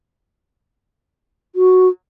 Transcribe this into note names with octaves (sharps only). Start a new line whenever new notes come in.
F#4